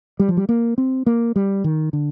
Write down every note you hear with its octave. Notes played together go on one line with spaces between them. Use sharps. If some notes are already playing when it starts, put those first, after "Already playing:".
G3
F3
G3
A#3
C4
A#3
G3
D#3
D3